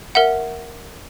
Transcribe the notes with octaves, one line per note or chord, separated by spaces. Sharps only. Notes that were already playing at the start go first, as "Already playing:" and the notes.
A#4 E5 F#5